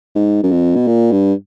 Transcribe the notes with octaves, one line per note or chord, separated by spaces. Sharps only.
G#2
F#2
F2
B2
A#2
G2